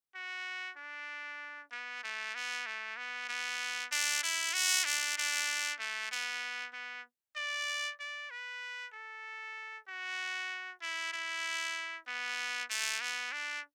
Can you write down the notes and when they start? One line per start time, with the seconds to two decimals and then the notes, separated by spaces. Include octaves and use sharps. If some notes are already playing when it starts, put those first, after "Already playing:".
0.15 F#4
0.77 D4
1.71 B3
2.03 A3
2.35 B3
2.66 A3
2.97 B3
3.29 B3
3.92 D4
4.23 E4
4.54 F#4
4.85 D4
5.17 D4
5.79 A3
6.11 B3
6.73 B3
7.36 D5
8.00 D5
8.30 B4
8.93 A4
9.88 F#4
10.82 E4
11.13 E4
12.07 B3
12.70 A3
13.01 B3
13.32 D4